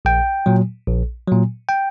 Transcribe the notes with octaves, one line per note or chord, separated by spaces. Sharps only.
A#1 G5
A#2 F#3
A#1
A#2 F#3
G5